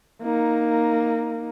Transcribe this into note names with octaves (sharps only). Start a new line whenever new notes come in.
A#3 D#4